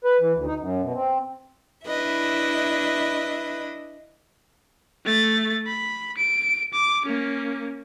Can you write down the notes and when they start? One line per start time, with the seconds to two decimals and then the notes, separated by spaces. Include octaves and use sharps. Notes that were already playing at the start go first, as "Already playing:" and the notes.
0.05 B4
0.21 E3
0.33 D2
0.46 D#4
0.60 F#2
0.82 B2
0.94 C4
1.87 D4 E4 B4 D#5 E5
5.05 A3 A6
5.67 B5
6.17 D7
6.73 D6
7.06 A#3 C#4